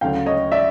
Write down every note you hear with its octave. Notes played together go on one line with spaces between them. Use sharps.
D2 C#3 F#3 F5 G5
C#5 D#5
D5 E5